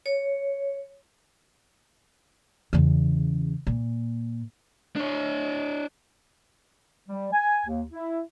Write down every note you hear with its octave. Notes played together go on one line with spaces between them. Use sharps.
C#5
E2 C#3
A#2
D4 C#5
G3
G#5
D#2
E4